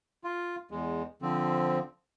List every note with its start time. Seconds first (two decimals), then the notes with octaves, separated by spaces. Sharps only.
0.24 F4
0.71 E2 G#3
1.22 D3 F3 C4